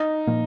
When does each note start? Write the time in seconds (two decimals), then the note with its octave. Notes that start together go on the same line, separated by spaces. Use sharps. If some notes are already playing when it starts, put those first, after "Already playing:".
Already playing: D#4
0.27 A#2 F3 A#3